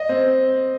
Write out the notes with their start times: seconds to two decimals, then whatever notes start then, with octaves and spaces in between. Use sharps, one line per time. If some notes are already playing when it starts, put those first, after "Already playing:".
Already playing: D#5
0.09 C4